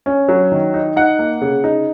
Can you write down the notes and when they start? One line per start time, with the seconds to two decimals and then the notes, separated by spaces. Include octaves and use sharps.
0.06 C#4
0.29 F#3
0.52 D#3
0.74 D#4
0.96 D#4 F#5
1.19 A#3
1.41 C#3
1.64 D#4